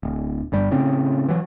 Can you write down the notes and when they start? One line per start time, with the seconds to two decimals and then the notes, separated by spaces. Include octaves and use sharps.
0.03 D1
0.52 G1 G2 G3
0.71 A2 C#3 C4
1.29 E3 F#3